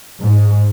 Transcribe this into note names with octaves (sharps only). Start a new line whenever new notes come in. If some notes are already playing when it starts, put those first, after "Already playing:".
G#2